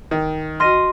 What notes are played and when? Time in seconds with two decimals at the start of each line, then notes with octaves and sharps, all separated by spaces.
0.11 D#3
0.60 F#4 D#5 C6 F6 A#6 D#7